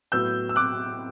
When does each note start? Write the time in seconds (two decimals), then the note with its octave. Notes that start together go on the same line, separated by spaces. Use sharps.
0.12 A2 F#3 B3 E6 G6
0.49 E6
0.56 D6 F#6